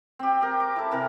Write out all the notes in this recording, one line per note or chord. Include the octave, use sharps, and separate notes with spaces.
C4 G4
G4 A#4
D6
E4 A4
C3 E3 A#4